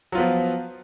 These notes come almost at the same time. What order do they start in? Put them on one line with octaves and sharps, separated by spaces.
F#3 F4 B3 F3